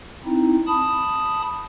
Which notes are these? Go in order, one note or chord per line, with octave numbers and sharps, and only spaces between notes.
C4 D#4 E4
A5 B5 D#6